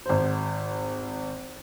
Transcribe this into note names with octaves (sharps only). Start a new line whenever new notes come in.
G#1 C5